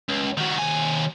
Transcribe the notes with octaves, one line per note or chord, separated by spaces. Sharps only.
C#2
D#3 F#4
D#2 G#5